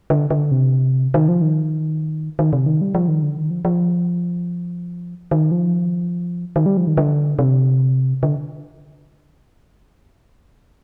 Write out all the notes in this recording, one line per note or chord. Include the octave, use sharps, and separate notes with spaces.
D3
D3
C3
D#3
F3
D#3
D#3
C3
D#3
G3
F3
D#3
D3
D#3
F3
F3
D#3
F3
D#3
G3
F3
D#3
D3
C3
D3